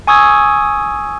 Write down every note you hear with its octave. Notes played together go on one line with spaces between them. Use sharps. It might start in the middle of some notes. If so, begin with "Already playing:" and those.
G#5 C#6 D#6 E6 G#6